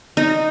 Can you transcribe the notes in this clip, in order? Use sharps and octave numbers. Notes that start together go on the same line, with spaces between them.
D#4